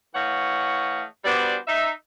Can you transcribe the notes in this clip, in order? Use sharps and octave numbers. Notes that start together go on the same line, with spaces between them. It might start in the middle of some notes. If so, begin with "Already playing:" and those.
E3 A3 C#5 D#5 F5 F#5
G3 B3 D4 F#4 C5 D5
D#4 E5